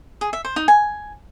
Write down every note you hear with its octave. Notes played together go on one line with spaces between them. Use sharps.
G#4
E5
C5
D#4
G#5